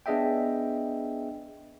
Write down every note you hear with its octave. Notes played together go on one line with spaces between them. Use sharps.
B3 D4 G#4 D#5 E5 G5